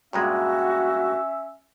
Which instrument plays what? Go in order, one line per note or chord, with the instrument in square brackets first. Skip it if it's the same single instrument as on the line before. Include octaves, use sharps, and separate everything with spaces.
[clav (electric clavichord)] G2 A#2 G#3 [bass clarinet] C#4 [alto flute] F#4 [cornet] E5